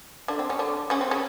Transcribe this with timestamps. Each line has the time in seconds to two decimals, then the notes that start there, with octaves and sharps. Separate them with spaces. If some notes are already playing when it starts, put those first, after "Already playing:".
0.28 D3 D4
0.39 C4
0.49 C#3 C#4
0.59 D3 D4
0.90 C#3 C#4
1.01 C4
1.11 C#3 C#4